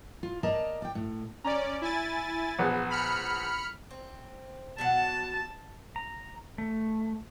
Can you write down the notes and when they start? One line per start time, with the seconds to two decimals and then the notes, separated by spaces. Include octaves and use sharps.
0.23 F4
0.43 A#3 A#4 D5 D#5 A5 A#5
0.82 D5 G5
0.95 A2
1.44 C#4 D5 A#5
1.82 E4 G#5 A6
2.59 A#1 B3 G#4
2.90 B5 F6 C#7
3.91 C4
4.78 B2 F#3 F#5 A5
5.96 A#5
6.58 A3